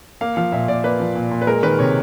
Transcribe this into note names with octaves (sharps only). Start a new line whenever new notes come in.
A#3 F5
F3 F5
A#2 E5
A#2 D5
A#3 B4
F3
A#2
A#2
B4
G#3 A#4
D#3 B4
C3 C#5